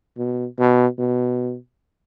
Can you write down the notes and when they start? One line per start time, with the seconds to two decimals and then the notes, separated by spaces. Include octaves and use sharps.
0.17 B2
0.59 B2
0.99 B2